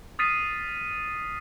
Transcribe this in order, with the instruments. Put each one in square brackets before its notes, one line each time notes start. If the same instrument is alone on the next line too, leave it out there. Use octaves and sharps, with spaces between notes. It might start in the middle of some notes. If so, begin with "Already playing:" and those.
[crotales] D#6 F6 A6 B6 C7 D#7